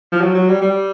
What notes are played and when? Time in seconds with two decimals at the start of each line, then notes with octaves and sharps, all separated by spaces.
0.12 F3
0.21 F#3
0.35 F#3
0.49 G3
0.62 G3